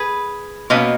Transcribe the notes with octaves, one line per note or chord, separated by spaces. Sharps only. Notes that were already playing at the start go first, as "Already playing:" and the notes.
Already playing: G#4 B4
B2 A#3 C#4 B4 D#5